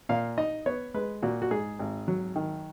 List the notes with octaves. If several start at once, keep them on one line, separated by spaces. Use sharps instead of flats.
A#2 F5
D#4 D#5
B3 C#5
G#3 B4
A#2 F#4
F#4
G#2 G#4
G#1
F#3
D#3